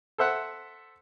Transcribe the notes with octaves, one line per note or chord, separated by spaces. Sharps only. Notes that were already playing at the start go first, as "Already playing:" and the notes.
A4 C5 E5 F#5